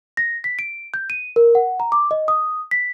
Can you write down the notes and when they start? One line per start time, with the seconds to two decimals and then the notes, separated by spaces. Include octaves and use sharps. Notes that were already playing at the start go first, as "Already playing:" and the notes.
0.17 A#6
0.44 B6
0.59 D7
0.94 G6
1.10 D#7
1.36 A#4
1.55 F#5
1.80 A#5
1.92 D6
2.11 D#5
2.28 D#6
2.71 B6